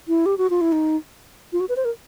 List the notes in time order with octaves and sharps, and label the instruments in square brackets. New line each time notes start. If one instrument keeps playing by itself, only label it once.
[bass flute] E4
G4
F#4
F4
E4
D#4
F4
F#4
B4
C5
A#4